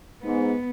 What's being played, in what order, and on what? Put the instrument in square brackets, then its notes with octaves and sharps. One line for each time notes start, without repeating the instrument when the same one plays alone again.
[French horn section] G#2 [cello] B3